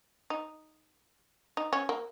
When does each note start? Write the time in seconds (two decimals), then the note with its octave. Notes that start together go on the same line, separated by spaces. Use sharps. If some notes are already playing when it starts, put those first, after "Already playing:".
0.30 D#4
1.57 D#4
1.73 C#4
1.89 A#3